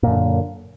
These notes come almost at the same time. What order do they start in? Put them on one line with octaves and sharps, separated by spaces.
A#2 F#2 D3